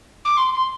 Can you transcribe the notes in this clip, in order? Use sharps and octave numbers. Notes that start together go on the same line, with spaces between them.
D6
C6
C6